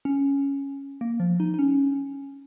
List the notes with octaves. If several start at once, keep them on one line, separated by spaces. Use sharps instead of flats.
C#4
A#3
F3
D#4
D#4
C#4